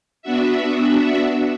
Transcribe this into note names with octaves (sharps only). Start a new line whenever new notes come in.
B3 D4 F#4 E5